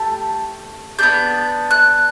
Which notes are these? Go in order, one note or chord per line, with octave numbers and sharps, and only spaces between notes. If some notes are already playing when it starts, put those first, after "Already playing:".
Already playing: A3 G4 A5
B3 D4 G4 G6
F#6